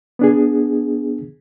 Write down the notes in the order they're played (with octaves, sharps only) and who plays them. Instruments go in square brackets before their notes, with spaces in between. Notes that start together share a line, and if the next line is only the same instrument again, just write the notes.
[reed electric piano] B3 D4 G#4